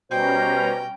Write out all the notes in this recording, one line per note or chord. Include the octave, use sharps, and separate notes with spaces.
B2 G3 C#4 C5 G5 A#5